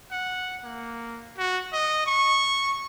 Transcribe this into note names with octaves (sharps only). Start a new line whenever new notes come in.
F#5
A#3
F#4
D#5
C#6